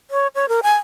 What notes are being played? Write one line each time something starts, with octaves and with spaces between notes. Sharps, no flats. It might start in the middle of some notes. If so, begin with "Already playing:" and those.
C#5
C#5
A#4
G#5